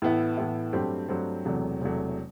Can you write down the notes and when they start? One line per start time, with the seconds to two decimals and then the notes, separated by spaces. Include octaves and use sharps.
0.02 A2 E3 B3 E4
0.37 A2 E3 B3 E4
0.73 G2 F#3 A3 C4 G4
1.09 G2 F#3 A3 C4 G4
1.45 E1 E2 C3 F#3 A3
1.81 E1 E2 C3 F#3 A3